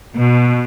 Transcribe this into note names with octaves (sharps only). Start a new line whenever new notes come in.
B2